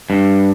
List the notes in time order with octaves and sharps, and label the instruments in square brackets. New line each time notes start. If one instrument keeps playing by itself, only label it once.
[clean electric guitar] G2